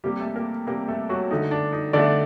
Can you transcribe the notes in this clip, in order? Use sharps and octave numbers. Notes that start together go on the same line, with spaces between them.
C3 G3 A#3 G4
A3 A4
A#3 A#4
C3 G3 A#3 A#4
A3 A4
F#3 F#4
D3 A3 D#4
D4
D#4
D3 A3 D4 D5